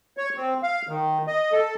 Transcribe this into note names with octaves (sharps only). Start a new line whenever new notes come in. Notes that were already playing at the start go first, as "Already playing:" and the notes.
C#5
C4
F5
D#3
D#5
A4